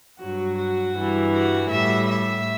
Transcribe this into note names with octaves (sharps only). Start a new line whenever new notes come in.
G2 F#3 F#4
F#4
G2 E3 G3
F#4
A2 G3 E5
E5